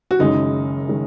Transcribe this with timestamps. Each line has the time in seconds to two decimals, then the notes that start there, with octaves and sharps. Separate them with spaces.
0.11 F#4
0.19 F#1 F#2 D#3 G#3 D#4
0.89 D#3 G#3